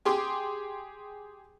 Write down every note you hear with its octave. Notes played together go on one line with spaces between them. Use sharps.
G4 G#4 C6 D6